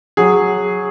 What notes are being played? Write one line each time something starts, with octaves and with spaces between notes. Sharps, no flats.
F#3 G#4